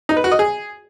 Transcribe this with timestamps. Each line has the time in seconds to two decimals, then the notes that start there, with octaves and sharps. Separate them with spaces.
0.09 D#4
0.17 B4
0.24 F#4
0.32 D#5
0.39 G#4